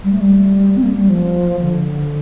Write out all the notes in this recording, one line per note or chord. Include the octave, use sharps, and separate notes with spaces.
G3
A3
G3
C4
A#3
G3
F3
D3